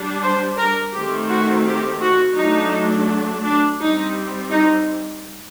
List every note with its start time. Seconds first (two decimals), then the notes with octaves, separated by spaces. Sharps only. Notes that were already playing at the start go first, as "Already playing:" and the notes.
Already playing: G3 D4
0.23 C5
0.59 A#4
0.94 D#3 A3 C4 G4
1.30 F#4
1.66 G4
2.02 F#4
2.36 F#3 A3 D4 D#4
3.44 D4
3.80 G3 C4 D#4
4.50 D#4